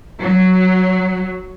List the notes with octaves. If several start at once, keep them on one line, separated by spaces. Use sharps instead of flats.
F#3